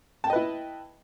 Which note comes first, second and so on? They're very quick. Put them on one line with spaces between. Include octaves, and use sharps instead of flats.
A5 G5 D#5 B4 E4